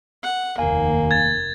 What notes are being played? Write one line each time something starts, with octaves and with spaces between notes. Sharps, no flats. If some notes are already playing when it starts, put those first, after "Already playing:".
F#5
F1 D#2 A#3 F5 G#5
G#6 A6